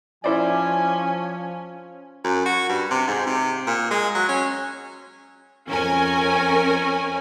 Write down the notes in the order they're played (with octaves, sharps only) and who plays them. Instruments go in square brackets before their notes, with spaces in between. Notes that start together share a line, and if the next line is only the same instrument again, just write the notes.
[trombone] F3 [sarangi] C#4 [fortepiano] E4 C5 D5 [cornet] G#5
[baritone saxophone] F#2
F#4
G2
C3
G#2
C3
A#2
G#3
F#3
C#4
[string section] F2 C#4 A#4 G#5